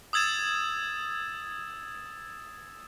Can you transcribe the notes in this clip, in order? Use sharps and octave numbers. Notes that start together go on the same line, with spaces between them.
D#6 E6 G#6 A6 E7